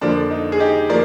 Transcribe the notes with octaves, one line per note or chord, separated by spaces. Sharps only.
F2 D3 F3 A#3 D4
D#4
G#4
D#4 G4
F3 A#3 A#4 D5